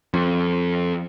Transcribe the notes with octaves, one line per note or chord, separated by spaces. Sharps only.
F2